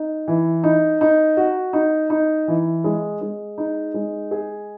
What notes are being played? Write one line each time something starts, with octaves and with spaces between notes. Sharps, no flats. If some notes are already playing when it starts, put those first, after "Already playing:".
Already playing: D#4
E3
D#4
D#4
F#4
D#4
D#4
E3
G#3
G#3
D#4
G#3
G#4